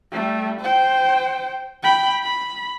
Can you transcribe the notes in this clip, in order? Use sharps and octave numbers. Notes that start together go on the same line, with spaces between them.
G3 A3
C5 G5
G5 B5
B5